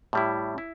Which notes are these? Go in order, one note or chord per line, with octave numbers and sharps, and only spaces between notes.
A2 G3 E4
E4